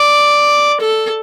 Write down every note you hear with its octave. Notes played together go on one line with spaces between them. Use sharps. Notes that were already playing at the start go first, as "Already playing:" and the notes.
Already playing: D5
A4